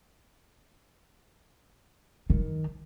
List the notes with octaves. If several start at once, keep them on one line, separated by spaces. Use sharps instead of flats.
D#3